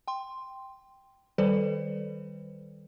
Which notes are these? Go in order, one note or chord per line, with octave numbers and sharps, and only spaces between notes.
G5 C6
D#3 G3 A4 B4 C5 D5